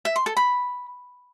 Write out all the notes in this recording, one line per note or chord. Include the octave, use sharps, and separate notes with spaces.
E5
C6
A4
B5